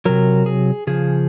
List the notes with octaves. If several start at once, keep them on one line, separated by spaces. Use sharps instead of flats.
C3 F#3 A#4
G#4
C#3 F3 G#4